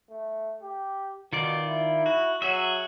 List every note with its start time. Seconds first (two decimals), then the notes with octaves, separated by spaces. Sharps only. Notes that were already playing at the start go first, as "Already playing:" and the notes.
0.11 A3
0.63 G4
1.33 B2 D#3 F4 D5
1.67 E4
2.06 F#4
2.42 F#3 F#4 G#4 E5